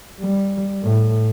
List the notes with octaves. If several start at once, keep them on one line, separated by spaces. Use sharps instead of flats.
G3
A2